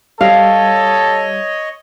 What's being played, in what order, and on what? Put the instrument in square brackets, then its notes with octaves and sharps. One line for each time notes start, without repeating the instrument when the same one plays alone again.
[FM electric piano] G3 [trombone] A4 [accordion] C#5 D#5 [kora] F5